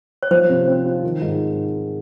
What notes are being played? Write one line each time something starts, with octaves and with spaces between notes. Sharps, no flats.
C#5
F3 C5
C3
C4
F4
D#3
G#2